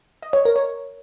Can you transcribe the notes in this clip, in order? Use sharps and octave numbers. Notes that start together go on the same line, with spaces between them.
D#5
C#5
A#4
C#5